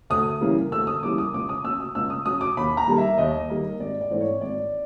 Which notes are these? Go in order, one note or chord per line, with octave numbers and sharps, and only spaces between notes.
D2 D#6
C#3 E3 G3 A#3
D2 E6
D#6
C#3 E3 G3 A#3 D6
D#6
C#2 D6
D#6
C#3 F#3 E6
D#6
C#2 E6
D#6
C#3 F#3 D#6
D6
D#2 B5
A#5
D#3 G3 A#3
E5
D#2 D#5
D#3 G3 A#3
G#1 D5
D5
G#2 E3 A3 C4
C#5
G#1 D5